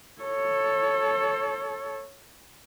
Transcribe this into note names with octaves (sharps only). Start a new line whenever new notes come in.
A4 C#5